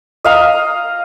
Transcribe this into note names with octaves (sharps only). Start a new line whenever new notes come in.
D#5 F5 A#5